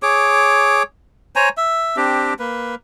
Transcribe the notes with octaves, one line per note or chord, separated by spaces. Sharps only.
G#4 C#5 D6
C5 C#5 G#5 A#5
E5
C4 D4 G4
A#3 B4